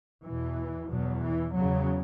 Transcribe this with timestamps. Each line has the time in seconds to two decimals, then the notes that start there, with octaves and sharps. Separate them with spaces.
0.25 E2 B2 E3
0.90 E2 B2 F#3
1.22 E3
1.54 E2 C#3 F#3